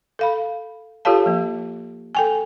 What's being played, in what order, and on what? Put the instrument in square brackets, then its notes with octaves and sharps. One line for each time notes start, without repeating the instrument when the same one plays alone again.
[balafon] A4 F5 B5
F4 G4 A4 C#5 F5 A5
F3 A#3
A4 G5 G#5